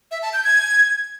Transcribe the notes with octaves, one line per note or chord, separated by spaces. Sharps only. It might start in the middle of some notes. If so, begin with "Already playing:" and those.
E5
A5
G6
G#6